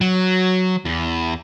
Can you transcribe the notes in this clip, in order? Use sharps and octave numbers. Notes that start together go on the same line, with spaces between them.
F#3
E2